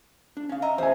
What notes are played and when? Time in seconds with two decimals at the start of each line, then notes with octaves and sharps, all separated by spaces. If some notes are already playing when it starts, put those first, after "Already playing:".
0.37 D4
0.49 C#4 F5
0.62 D#5 E5 A#5
0.78 E2 C5 E5 G#5 D#6